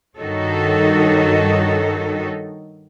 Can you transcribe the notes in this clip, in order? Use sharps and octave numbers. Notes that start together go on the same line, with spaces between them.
G2 D#3 D#4 F#4 A4 C#5